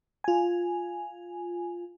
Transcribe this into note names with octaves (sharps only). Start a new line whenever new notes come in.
F4 G#5